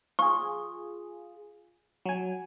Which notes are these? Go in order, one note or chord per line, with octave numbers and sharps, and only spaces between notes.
F4 G#4 C#6
F#3 G#5